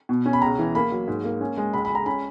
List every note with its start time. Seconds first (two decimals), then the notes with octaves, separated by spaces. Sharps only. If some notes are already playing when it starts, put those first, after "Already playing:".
0.09 B2
0.26 C#4
0.33 B5
0.42 C#2 A#5
0.59 E3
0.75 A#3 B5
0.92 F#3
1.08 G#2
1.24 A#3
1.41 C#4
1.57 G#3
1.73 C#2 B5
1.85 B5
1.89 G#3
1.95 A#5
2.06 C#4 B5